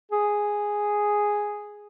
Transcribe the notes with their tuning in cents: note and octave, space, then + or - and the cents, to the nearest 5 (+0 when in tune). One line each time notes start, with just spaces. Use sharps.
G#4 -5